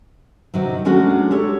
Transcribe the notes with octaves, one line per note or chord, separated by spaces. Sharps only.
C3 D#3 F#3
F#3 G#3 A3 C#4 D4 F#4
G4 A4 C#5